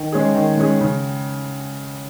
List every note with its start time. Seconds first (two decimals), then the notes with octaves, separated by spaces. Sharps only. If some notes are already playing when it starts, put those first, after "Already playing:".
Already playing: D#3
0.12 G#3 C#4 G#4
0.35 D#3
0.57 G#3 C#4 G#4
0.81 C#3